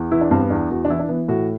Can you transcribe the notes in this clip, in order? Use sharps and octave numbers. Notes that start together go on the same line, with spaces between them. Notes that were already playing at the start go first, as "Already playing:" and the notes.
Already playing: E2
E3 E4
D4
G2 C4
B3
E2 D4
E2 F#4
D4
E3 E4
D4
E3 B3
A2 F#4